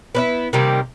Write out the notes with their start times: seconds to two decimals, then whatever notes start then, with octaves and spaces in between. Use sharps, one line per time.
0.15 B3 D4 E4
0.53 C3 D#3 G3 A#3